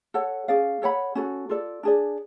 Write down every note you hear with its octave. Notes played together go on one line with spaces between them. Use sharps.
A4 C#5 F#5
C#4 G#4 D5 F5
A4 C#5 F#5 B5
C#4 F#4 A4
F4 A4 D5
D4 G#4 D5